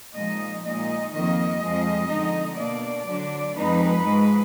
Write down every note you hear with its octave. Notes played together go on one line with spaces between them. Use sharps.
A#2 F3 G#3 D#4 D#5
A#2 G#3 D#4 D#5
F2 D#3 A#3 D#5
F2 F3 G#3
F2 D3 G#3 D#4
B2 A#3 D4 D5
D3 F#3 D4
F2 F3 G#3 D#4 B4
G#2 F3 G#3